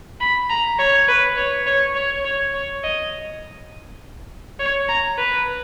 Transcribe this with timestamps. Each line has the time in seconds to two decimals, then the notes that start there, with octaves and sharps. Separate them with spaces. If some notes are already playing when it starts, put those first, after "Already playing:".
0.21 B5
0.50 A#5
0.79 C#5
1.08 B4
1.37 C#5
1.67 C#5
1.96 C#5
2.25 C#5
2.54 C#5
2.84 D#5
4.59 C#5
4.89 A#5
5.18 B4